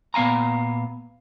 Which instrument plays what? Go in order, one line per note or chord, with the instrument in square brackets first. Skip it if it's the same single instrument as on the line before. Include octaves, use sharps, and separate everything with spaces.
[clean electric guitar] A#2 B3 F5 G#5 A#5